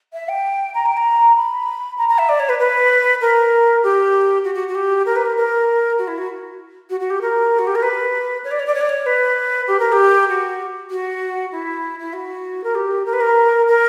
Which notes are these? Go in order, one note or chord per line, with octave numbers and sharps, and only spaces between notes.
E5
G5
A#5
G5
A#5
B5
A#5
A#5
E5
D5
C#5
B4
B4
A#4
G4
F#4
F#4
F#4
G4
A#4
B4
A#4
A#4
F#4
E4
F#4
F#4
F#4
G4
A#4
F#4
G4
A#4
B4
C#5
D5
C#5
D5
C#5
D5
C#5
B4
G4
A#4
G4
F#4
F#4
E4
E4
F#4
A#4
G4
A#4
B4
A#4
A#4